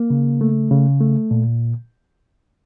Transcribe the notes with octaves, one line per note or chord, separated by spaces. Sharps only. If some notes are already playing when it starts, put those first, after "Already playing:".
Already playing: A#3
C#3
A3
C#3
A3
A#2